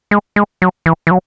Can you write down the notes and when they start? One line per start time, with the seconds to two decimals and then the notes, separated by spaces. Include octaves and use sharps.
0.11 G#3
0.36 G#3
0.62 F#3
0.86 E3
1.07 E3
1.11 F#3